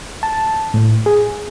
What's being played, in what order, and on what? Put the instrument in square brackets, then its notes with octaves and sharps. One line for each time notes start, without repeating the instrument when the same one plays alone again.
[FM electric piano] A5
A2
G#4